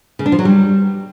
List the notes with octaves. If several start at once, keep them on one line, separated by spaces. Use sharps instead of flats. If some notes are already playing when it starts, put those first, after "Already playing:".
C#3
D4
F3
F#3
G3